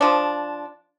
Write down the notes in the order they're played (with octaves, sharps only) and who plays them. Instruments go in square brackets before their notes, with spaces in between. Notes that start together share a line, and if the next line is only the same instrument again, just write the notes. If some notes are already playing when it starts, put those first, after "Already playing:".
[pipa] F3 D4